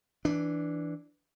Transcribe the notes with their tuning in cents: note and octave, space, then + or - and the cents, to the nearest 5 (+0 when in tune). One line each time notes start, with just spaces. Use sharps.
E3 +0 D4 +0